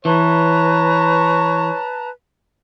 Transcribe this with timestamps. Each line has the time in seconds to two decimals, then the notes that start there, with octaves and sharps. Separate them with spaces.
0.05 E3 B4 C#5 A5 A#5